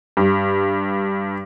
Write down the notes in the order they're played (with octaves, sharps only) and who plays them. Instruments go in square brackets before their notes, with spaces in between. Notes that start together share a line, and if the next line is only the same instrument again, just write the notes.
[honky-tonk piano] G2